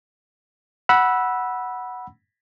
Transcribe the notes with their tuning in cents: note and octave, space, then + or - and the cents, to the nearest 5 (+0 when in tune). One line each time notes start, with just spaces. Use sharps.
F#5 +0 B5 -15 E6 +0